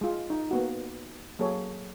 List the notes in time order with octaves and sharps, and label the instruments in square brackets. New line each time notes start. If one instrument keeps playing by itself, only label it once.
[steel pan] G#3 F4
D#4
A#3 B3 F#4
F#3 A#3 G#4 A4 C#5